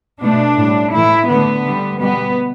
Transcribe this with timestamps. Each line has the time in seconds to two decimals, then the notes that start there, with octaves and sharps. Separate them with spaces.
0.21 B2 A3 D4
0.57 A2 G3
0.93 A2 E3 A3 E4
1.29 D3 A3 B3
1.65 D3 G3
2.00 B2 G3 B3